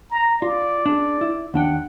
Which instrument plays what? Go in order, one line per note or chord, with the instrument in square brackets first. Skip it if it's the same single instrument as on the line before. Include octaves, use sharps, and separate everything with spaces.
[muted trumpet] A#5
[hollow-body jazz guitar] F4 [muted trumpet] D5
[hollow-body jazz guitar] D4 G#4
E4
[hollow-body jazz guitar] D#2 D4 G5 [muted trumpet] F#5